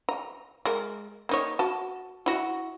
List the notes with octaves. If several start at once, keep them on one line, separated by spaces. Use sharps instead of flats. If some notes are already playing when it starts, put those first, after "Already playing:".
A#5
G#3 A#4
A#3 D#4 C#5
F#4 A5
E4 F#4